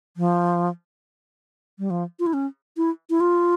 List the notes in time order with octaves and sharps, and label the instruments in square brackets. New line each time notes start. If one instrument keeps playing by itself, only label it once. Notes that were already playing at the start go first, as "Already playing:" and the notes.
[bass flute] F3
G3
F3
F4
E4
C#4
E4
E4
F4